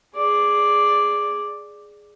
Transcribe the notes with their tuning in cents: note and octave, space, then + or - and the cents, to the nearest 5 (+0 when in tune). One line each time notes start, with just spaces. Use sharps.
G#4 +0 D5 +0